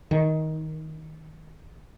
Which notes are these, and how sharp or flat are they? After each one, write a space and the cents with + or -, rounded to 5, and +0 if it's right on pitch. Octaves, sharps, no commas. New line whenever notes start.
D#3 +15